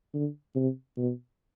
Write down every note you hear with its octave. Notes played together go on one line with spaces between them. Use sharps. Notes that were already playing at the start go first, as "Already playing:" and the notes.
D3
C3
B2